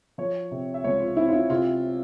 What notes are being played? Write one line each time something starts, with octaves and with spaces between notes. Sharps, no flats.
F3 C#5
C3
E5
C#2 C#5
F4
C4 E4
F4
E4
C3 F4